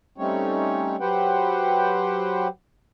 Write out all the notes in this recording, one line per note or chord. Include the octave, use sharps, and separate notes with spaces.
G3 A3 C4 C#4 D#4 C#5
F#3 G4 B4 C5 F#5 G5